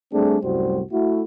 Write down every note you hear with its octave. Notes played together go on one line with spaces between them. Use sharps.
G3 A3 C4 D4 G#4
C2 F#2 A2 G3 F#4 C5
A3 E4 F#4